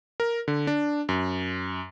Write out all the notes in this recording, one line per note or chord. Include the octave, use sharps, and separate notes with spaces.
A#4
D3
D4
F#2